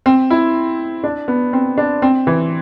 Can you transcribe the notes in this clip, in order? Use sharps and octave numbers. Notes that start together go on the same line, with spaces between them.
C4
E4
D4
B3
C4
D4
C4
E3